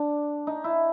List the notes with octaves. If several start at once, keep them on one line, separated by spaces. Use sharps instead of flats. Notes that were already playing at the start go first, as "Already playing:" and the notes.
Already playing: D4
D#4
E4